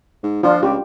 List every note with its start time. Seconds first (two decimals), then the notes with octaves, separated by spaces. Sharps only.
0.23 G#2
0.43 F3 D4 F4
0.63 C#2 G4